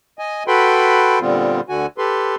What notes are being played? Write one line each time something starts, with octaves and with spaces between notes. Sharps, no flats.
D#5 G#5
F#4 A4 B4 G5 B5 C6
A#2 D3 G3 B3 C4 F4
D2 D3 F#4 G#5
G4 A4 B4 C6